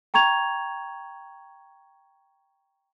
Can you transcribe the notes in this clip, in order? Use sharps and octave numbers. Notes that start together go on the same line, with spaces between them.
G5 A#5 C#6 G#6 F7